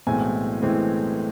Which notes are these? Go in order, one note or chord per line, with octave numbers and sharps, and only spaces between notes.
B1 A2 E3 G#3 C4 G#5
A2 E3 G#3 C4